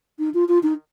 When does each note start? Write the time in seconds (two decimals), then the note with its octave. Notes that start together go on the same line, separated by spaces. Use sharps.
0.19 D#4
0.34 F4
0.48 F4
0.63 D#4